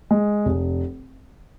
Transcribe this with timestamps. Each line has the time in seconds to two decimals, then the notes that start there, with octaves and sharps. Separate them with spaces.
0.11 G#3
0.45 F1